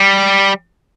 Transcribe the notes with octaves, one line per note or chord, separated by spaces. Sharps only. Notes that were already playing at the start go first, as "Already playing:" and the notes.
Already playing: G3